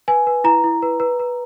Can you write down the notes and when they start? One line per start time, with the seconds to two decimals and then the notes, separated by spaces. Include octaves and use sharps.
0.08 B4 G#5
0.27 B4
0.44 E4 A#5
0.64 E4
0.82 B4
1.00 B4
1.19 B4